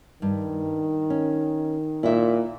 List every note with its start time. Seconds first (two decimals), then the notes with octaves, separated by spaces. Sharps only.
0.22 G2 D#3
1.10 C#4
2.03 A#2 E4 D#5 E5